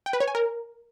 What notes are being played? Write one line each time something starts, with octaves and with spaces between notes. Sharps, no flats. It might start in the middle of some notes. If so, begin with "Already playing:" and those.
G5
B4
C#5
G#5
A#4